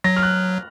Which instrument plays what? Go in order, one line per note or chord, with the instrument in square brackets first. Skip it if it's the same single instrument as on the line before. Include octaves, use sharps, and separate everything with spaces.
[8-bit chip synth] F#3 [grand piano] A#6
[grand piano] F6
F#6